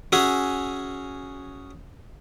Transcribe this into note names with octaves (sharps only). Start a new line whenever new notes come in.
C#4 F#4 G#4 E5